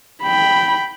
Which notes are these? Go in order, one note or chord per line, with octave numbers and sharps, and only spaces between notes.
G5 B5